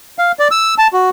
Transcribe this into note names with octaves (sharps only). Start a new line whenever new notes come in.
F5
D5
E6
A5
F#4